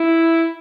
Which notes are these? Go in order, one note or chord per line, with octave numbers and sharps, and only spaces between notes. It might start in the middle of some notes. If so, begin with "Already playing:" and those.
Already playing: E4